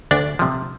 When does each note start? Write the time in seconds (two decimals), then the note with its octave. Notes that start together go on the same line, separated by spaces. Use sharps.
0.11 D2 D4 D5
0.39 C3 F3